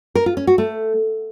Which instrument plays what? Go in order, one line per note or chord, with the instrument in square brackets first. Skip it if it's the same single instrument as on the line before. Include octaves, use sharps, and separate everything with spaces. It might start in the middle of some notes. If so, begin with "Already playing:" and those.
[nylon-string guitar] A#4
F4
C#4
F#4
A3